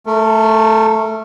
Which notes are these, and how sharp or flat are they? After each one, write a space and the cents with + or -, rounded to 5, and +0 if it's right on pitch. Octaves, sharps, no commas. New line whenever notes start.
A3 +0 A#4 -30